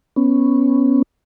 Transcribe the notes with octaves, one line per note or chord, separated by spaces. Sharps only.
B3 C#4